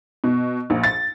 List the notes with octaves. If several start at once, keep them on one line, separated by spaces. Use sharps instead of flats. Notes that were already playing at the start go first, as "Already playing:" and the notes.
B2
A#1
A6